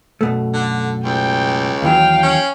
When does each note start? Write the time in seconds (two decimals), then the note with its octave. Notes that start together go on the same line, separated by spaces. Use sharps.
0.21 F#2 B2 A3
0.54 D3
1.04 C#2 G5
1.82 D#2 E3 F#3 F5 G5
2.23 C#4